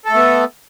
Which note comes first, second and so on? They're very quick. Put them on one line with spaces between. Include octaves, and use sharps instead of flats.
A4 A3 B3